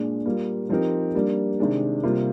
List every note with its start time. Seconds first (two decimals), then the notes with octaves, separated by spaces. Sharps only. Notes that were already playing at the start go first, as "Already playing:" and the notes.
Already playing: A#2 G#3 D4
0.25 G3 A#3 F4
0.69 F3 C4 D#4 G4 A#4
1.15 G3 A#3 D4
1.60 C3 D#3 G#3 D4
2.03 C3 G3 A#3 F4